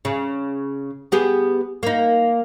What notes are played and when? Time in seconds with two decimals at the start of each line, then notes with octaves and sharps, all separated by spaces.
0.05 C#3
1.12 B3 G4 G#4
1.83 A#3 D#4